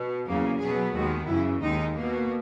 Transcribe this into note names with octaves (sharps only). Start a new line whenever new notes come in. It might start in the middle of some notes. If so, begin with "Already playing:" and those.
Already playing: B2
E2 C#3 F#3 A#3
B2 F#3 B3 G#4
D#2 D#3 G#3 B3 F#4
F#2 C#3 E3 E4
D#2 D#3 G#3 D#4
B2 A#3